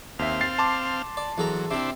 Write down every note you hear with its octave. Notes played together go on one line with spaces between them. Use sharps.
D#2 C4 E5 F5
A6 C7
A5 C6 D6
D5
E2 F#3 A4 A#5
C3 C4 D4 E4 C5